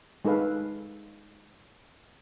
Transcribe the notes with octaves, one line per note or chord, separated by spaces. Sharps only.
G#3 D#4 A4 B4 F5